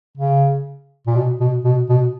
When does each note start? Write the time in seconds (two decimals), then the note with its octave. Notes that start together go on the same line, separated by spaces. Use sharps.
0.17 C#3
1.07 A#2
1.16 B2
1.40 B2
1.64 B2
1.89 B2